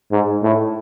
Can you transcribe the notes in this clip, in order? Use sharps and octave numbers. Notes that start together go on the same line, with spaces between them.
G#2
A2